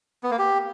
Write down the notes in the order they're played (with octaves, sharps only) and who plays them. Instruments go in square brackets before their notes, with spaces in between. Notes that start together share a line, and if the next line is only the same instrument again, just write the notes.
[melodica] B3
A#3
G4